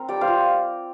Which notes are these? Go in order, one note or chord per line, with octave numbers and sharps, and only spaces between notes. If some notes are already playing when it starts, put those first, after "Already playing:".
Already playing: C4 A#4
G3 D5 G5
C5 F5
F4